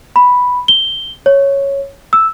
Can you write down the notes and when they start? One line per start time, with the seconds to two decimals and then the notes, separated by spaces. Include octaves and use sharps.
0.16 B5
0.68 G7
1.26 C#5
2.13 E6